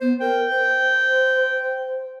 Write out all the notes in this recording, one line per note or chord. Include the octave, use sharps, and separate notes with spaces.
B3 C5
A#4 G5
C5